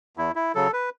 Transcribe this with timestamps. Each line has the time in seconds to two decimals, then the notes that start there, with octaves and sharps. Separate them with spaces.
0.17 E2 E4
0.36 E4
0.55 C#3 F#3 A4
0.73 B4